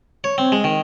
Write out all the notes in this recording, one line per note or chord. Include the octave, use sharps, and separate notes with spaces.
C#5
C4
G#3
D#3